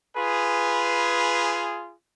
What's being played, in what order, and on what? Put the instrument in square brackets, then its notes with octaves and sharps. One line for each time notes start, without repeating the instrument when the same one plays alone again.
[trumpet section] F4 G#4 [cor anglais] B4